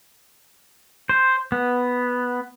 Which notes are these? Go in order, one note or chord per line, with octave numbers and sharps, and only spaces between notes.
C5
B3